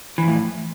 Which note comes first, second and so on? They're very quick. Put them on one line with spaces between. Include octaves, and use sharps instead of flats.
E3 F2 A2